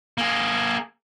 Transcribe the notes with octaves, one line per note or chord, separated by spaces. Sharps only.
A#3 G#4